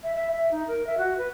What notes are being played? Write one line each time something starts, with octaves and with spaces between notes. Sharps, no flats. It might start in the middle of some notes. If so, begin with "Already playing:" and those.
E5
E5
E5
D#4
A#4
E5
F#4
B4